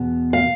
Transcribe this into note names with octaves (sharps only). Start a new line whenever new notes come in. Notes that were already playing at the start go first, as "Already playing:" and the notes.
Already playing: E2 B2 B3
F5